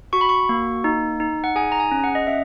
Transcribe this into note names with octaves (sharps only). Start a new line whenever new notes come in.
F#4 C#6
B5
C#6
A#3
D#4
D#4
F#5
G#4 G#5
A#5
G#5
C#4
F#5
D#5
C#4 E5